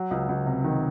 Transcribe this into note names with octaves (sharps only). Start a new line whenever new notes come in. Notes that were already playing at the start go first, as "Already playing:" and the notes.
Already playing: F#3
C#2
C#2
C3
D#3